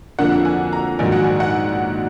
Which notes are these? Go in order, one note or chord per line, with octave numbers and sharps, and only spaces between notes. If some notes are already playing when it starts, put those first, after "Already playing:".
F2 D3 F3 A#3 D4 F#5
G#5
A#5
A#1 G#2 D#3 F#3 G#5
F#5
G#5
F#5